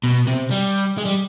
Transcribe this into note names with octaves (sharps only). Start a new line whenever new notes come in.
B2
C3
G3
G#3
G3